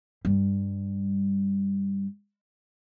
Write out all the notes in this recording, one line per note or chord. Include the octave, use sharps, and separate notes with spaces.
G2 G3